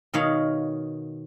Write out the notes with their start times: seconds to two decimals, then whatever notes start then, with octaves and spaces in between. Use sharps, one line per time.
0.14 B2 D#3 C#5 F5